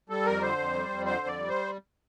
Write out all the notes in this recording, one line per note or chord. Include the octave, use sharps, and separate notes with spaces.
G3 A4
F2 A#4
D3 C5
F2
G3
F2
D3 C5
F2
D5
G3
C5